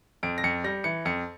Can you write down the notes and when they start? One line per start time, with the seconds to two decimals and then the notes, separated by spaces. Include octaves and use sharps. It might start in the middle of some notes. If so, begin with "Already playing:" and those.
0.23 F2 D7
0.38 A#6
0.44 F2 C#7
0.64 G3 A#6
0.84 E3 C#7
1.05 F2 C#7